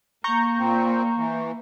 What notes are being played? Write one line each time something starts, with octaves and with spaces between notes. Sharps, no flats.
A#3 A#5 C#6 G6
A#2 C4
E3